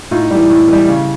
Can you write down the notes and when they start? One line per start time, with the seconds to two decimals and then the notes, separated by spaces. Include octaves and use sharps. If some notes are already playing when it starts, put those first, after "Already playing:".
0.11 A2 D#4 F4
0.31 E3 G3
0.50 A2
0.68 E3 G3
0.88 C#3